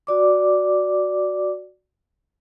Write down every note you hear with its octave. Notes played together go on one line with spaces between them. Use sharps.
F#4 D5 D6